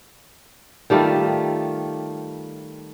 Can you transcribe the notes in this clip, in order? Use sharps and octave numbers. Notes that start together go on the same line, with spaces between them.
D#3 G3 A3 F4